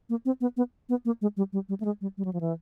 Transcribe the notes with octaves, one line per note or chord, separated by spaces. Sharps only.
A#3
C4
B3
B3
B3
A#3
G#3
G3
G3
G3
A3
G#3
G3
G3
F#3
F3
E3